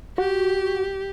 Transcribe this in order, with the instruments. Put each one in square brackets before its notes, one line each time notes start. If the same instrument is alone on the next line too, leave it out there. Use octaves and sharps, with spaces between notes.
[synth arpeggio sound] F#4 [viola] G4